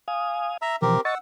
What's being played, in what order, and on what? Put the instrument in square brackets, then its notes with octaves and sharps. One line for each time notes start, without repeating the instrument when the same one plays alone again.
[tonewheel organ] F5 G#5 D#6
[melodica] E5 A#5 E6
[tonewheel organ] B2 E3 F3 [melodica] C4 G4 A#4
[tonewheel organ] D#5 C#6 A6 [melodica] F#5 E6